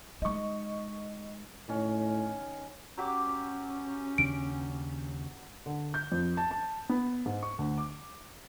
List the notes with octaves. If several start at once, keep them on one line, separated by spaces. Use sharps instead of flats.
G#3 D#4 D#5 C#6
A2 D#3 C#4
F#3 C#4 G4 D6
D#2 C#3 D4 D7
D3
G6
F2
A5
A5
B3
G#2
C#6
D2
D6